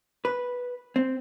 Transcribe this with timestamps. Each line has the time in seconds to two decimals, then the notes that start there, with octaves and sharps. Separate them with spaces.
0.25 B4
0.96 C4